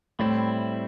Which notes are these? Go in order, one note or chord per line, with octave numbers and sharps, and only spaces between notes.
A2 G3 C4 E4